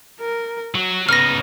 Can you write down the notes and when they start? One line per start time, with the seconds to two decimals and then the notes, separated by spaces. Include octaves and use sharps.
0.20 A#4
0.75 F#3 F#4
1.09 C#3 B3 D#4 F6 A#6